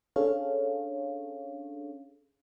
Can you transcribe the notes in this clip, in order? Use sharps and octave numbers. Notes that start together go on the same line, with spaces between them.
C#4 D4 G#4 A4 C#5 F5